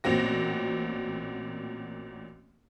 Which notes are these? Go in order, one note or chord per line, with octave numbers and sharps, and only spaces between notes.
A1 A#2 C4 F#4 A#6